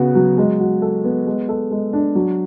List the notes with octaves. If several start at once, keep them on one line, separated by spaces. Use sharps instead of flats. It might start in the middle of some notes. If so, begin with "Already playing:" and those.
Already playing: C#3 B3 F#4
F#3
G#3
F#4
A4
B3
G#3
A4
G#3
D4
F#3